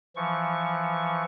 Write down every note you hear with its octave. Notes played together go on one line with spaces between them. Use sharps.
E3 F3 C#6